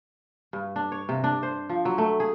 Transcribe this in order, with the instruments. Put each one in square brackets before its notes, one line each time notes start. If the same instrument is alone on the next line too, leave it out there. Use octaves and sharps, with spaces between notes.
[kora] G2
D4
C#5
C3
D4
C5
F3
F#3
A3
G#4